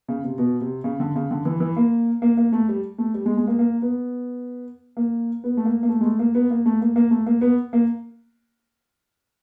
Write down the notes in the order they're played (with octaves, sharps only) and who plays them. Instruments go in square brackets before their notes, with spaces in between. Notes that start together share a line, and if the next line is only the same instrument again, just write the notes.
[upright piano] C#3
C3
B2
C3
C#3
D3
C#3
D3
E3
E3
A#3
A#3
A#3
A3
G3
A3
G3
G#3
G#3
A#3
A#3
B3
A#3
B3
A3
A#3
A#3
A3
G#3
A3
A#3
B3
A#3
A3
A#3
A#3
A3
A#3
B3
A#3